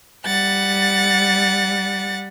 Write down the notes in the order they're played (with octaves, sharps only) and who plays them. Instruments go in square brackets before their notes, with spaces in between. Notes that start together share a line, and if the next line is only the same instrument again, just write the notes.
[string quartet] G3 F#5 A6